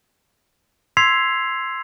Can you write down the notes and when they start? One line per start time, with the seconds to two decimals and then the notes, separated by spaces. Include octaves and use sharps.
0.97 C6 E6 G#6 B6 C7 F7